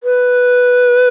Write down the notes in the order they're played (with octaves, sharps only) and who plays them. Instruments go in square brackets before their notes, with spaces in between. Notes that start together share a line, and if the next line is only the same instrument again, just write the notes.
[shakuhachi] B4